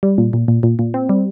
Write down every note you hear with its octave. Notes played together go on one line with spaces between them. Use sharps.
G3
A#2
A#2
A#2
A#2
A#2
C4
G3